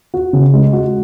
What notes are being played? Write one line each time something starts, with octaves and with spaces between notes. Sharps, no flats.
F#4
C#3
G#3
F#4